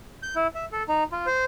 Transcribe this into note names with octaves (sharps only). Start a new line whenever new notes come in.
G6
E4
E5
A4
D#4
F4
C5